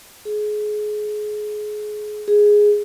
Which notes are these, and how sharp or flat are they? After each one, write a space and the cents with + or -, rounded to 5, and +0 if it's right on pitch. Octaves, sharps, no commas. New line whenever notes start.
G#4 +25
G#4 +0